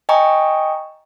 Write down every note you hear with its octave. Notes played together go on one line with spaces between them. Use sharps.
D#5 G5 G#5 A#5 C#6 D#6